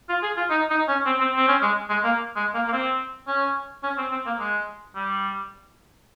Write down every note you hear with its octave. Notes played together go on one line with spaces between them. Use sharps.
F4
G#4
F4
D#4
D#4
C#4
C4
C4
C4
C#4
G#3
G#3
A#3
G#3
A#3
A#3
C4
C#4
C#4
C4
C4
A#3
G#3
G3